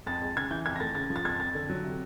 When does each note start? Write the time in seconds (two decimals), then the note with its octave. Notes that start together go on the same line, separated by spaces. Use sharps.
0.06 F2 A6
0.22 G#3
0.36 C#3 G#6
0.51 E3 G6
0.66 F2 G#6
0.76 A#6
0.80 A3 A6
0.95 C#3 A6
1.10 F3
1.16 A6
1.25 F2 G#6
1.40 F2 A6
1.55 D3
1.69 F#3
1.84 C3